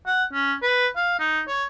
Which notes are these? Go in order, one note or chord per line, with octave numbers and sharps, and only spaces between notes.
F#5
C#4
B4
F5
D#4
C#5